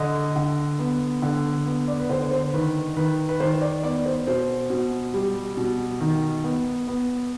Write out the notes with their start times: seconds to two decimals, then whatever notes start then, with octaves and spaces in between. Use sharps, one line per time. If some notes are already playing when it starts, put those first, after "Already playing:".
Already playing: D3 D#5
0.36 D3
0.79 B3
1.22 D3
1.66 B3
1.88 D5
1.99 B4
2.10 D3 C5
2.31 C5
2.54 D#3 B4
2.97 D#3 B4
3.29 B4
3.40 D#3 C5
3.61 D5
3.83 B3 D5
4.06 C5
4.27 B2 C5
4.70 B2
5.14 G3
5.57 B2
6.01 D#3
6.44 B3
6.88 B3